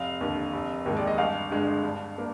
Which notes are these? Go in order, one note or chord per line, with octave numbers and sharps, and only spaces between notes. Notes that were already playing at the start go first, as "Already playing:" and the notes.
Already playing: F1 F5
D#2 D3
F1
D#2 D#3 G#3
D5
D#5
G1 F5
G2 D3 G#3
G2
A#3 D4